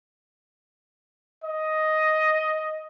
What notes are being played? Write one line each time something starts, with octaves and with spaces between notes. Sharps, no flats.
D#5